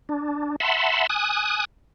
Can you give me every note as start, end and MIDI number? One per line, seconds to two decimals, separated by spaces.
0.09 0.56 62
0.60 1.07 76
0.60 1.07 78
0.60 1.07 81
0.60 1.07 83
0.60 1.07 84
1.10 1.65 80
1.10 1.65 87
1.10 1.65 90